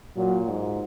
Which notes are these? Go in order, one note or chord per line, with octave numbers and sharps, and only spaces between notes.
A#2 F#3
G#2